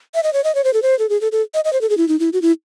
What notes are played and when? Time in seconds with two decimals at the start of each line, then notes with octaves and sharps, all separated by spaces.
0.15 E5
0.23 D#5
0.33 C#5
0.44 D#5
0.55 C#5
0.64 C5
0.74 A4
0.82 C5
0.99 A4
1.09 G#4
1.21 A4
1.32 A4
1.54 D#5
1.65 D#5
1.73 C5
1.81 A4
1.90 G#4
1.97 E4
2.08 D#4
2.20 E4
2.33 F#4
2.42 E4